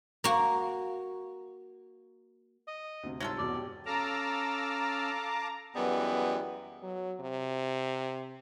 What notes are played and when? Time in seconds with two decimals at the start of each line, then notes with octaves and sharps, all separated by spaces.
0.24 A#3 F#4
2.68 D#5
3.03 D2 C3
3.20 C2 G#2 F#3 F4 A4
3.38 E1 E2 B2 D5
3.54 G4
3.86 C#4 A4 F5 A5 A#5 D6 E6 F6
5.75 F#2 E3 G3 G#3 B3
6.82 F#3
7.20 C3